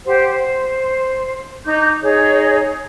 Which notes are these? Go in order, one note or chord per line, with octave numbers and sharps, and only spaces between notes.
G4 C5 F#5
C5
D#4 D6 G6
D#4 G#4 C#5